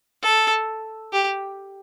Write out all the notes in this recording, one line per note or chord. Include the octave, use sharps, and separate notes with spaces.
A4
G4